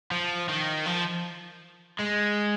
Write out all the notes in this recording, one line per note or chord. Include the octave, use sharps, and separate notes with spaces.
F3
D#3
F3
G#3